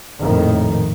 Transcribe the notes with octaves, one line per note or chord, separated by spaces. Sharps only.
A#1 F2 A2 D#3